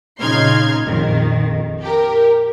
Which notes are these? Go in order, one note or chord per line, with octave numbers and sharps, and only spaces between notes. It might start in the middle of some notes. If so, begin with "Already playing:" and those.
A#2 C#3 D#4 C6 F6 G#6
A#1 F2 D#3
G4 A#4